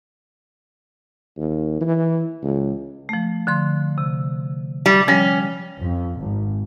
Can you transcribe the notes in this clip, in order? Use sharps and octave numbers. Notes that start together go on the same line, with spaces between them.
D#2
E3
C#2
F3 A3
D3 F3 C6
C3
G3
F3 G3 C#4
F2
G#1